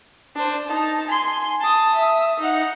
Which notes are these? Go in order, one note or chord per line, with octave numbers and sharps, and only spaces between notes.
D4 C5
D#4 A5
G#5 C6
A5 D#6
E5 D#6
D#4 F#5